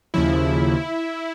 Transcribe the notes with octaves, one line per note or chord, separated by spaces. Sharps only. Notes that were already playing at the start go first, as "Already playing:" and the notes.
D#2 C#3 F3 E4